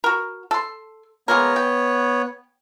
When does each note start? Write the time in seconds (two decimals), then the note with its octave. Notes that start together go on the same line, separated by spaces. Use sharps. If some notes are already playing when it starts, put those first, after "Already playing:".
0.04 F#4 A#4
0.51 A4 C6
1.28 G#3 A#3 B3 A#4 C#5
1.56 G5